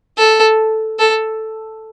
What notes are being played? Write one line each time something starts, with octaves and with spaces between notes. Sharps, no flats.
A4
A4